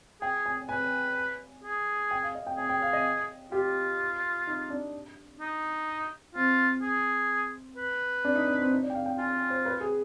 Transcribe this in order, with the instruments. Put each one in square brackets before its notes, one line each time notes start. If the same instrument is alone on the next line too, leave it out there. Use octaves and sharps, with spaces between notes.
[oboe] G#4 [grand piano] G5
[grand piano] G#5
[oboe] B4 [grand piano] G#5
[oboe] G#4
[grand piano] G5
F5
D#5
G5
[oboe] G#4 [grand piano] G#5
[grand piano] G5
F5
D#5
[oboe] F4 [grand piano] G4
[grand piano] D#4
D4
[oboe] D#4
[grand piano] C4 [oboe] F4
[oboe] G#4
B4
[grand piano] D4
D#4
D4
C4
D#4
D5
G5
F5
G5
[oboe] F4 [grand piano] G#5
[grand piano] C5
B4
G#4